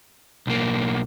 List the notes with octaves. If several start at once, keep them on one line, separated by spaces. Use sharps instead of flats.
B1 A#3